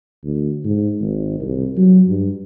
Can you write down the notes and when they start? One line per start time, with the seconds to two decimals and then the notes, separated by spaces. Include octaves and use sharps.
0.24 D2
0.64 G#2
1.00 G#1
1.40 C2
1.76 F#3
2.08 G2